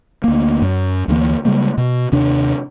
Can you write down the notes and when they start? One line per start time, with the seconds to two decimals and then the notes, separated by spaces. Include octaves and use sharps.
0.24 D2 A#3
0.62 F#2
1.08 D2 E3 F3 A#3
1.45 C#3 G3 G#3 A#3
1.78 B2
2.12 D#2 C3 D4